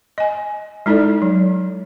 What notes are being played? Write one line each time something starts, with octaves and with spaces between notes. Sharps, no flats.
D#5 G#5
G#3 D#4 E4 A4 D5
F#3